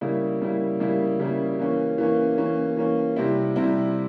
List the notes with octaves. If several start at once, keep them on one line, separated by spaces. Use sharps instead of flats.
C#3 G3 A#3 E4
C#3 G3 A#3 E4
C#3 G3 A#3 E4
C#3 G3 A#3 E4
E3 A#3 C#4
E3 A#3 C#4
E3 A#3 C#4
E3 A#3 C#4
C3 G3 C4 E4
C3 G3 C4 E4